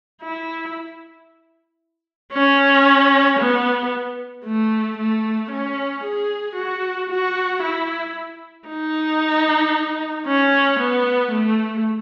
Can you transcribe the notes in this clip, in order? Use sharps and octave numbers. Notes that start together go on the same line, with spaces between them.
E4
C#4
B3
A3
A3
C#4
G#4
F#4
F#4
E4
D#4
C#4
B3
A3